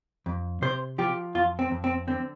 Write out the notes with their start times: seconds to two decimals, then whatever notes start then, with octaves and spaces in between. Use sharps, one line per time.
0.26 F2
0.62 C3 C5
0.98 F3 G4
1.35 F2 F4
1.59 C4
1.71 F2
1.84 C4
2.07 D3 C4